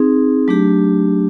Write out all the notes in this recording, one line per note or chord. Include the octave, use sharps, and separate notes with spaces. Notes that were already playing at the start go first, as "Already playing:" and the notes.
Already playing: C4 D#4 G#4
F#3 A3 D4 G4